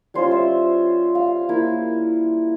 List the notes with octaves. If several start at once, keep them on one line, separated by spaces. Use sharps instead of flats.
G3 C#4 F4 C5
E5
F5
A#3 E4